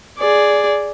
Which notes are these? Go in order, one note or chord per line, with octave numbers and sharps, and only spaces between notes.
G#4 D5